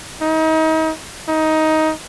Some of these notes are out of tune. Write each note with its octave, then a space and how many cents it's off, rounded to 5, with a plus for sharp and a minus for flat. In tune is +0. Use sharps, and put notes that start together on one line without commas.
D#4 +35
D#4 +15